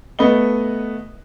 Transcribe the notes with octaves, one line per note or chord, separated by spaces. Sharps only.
A3 B3 B4 D#5 G7